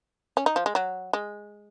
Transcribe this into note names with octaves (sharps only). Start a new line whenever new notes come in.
C#4
D#4
F3
G#3
F#3
G#3